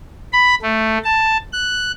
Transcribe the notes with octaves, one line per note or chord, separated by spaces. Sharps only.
B5
A3
A5
F#6